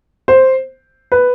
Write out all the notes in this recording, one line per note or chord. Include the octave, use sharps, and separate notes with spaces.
C5
B4